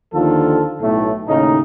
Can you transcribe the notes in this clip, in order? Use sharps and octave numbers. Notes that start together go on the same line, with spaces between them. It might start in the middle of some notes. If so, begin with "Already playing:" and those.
D#2 D3 D#3 F3 F4 A4
B1 A2 A3
D#2 A2 C#3 D#4